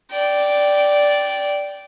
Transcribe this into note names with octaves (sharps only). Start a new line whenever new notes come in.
D5 G5